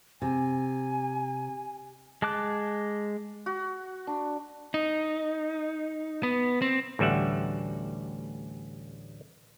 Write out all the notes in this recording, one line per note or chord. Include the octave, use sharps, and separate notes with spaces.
C3 G#5
G#3 A5 D6 F#6
F#4
D4
D#4
B3
C4
A1 D2 G3 E5 F#5